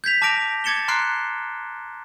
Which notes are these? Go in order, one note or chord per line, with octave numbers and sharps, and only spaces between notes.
G6 G#6 B6 F7
A5 D6 F6 A#6 D7 F7
D6 G#6 A6 C#7 E7 G7
A#5 C6 F6 F#6 C7 D7